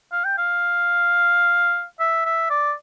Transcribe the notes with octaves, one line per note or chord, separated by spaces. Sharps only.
F5
G5
F5
E5
E5
D5